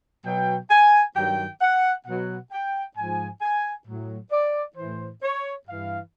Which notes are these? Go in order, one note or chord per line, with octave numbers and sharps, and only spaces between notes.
B2 F#3 G5
G#5
G2 D#3 F#3 G5
F#5
B2 F#3 F#5
G5
G#2 F3 G#5
G#5
A2 F#3
D5
A2 E3 C5
C#5
G2 E3 F5